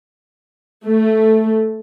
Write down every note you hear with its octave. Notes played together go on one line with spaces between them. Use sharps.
A3